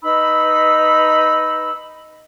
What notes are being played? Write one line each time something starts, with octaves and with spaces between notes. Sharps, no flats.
D#4 B4 B5 E6